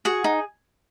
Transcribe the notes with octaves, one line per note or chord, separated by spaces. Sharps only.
F#4 G#4 F#5
D#4